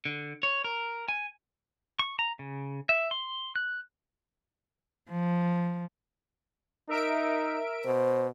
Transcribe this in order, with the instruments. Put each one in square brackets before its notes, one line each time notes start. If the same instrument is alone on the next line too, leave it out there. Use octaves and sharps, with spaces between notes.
[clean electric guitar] D3
C#5
A#4
G#5
[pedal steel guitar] C#6
A#5
C#3
E5
C6
F#6
[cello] F3
[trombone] D#4 [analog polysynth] A#4 E5 D7
[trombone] B2 [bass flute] C5